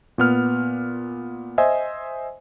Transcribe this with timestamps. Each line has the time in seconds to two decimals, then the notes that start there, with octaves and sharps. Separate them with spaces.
0.18 A#2 B3 F6
1.58 C5 D#5 E5 G#5